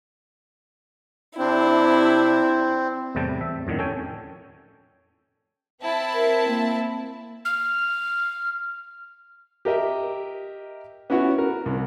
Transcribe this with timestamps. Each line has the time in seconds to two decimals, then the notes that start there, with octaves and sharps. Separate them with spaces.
1.38 C3 C4 D4 E4
3.15 E2 A2 C3 G3 G5 A5
3.41 E5
3.67 F2 A2 D3 D#3
3.79 C#4 A4 G5 G#5
5.81 C4 E4 A5
6.14 A#4
6.48 A#3
7.45 F6
9.65 G4 A#4 D#5 E5
11.10 B3 C#4 E4 F#4 C#5
11.38 A#4
11.66 C2